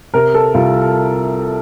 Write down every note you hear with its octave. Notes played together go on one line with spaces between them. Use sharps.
C3 A#4
A4
C2 F4